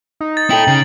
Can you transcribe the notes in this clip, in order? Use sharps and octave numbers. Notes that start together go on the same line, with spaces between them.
D#4
A6
E4 A4 G5 F#7
C#3